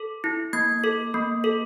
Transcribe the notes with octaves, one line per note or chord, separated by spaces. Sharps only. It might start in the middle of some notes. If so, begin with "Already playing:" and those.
Already playing: A4
E4
A#3 G#6
A4
A#3
A4